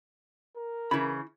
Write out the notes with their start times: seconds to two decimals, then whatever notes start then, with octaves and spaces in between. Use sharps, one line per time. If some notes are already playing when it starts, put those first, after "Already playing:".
0.57 A#4
0.91 C#3 E3 E4 B5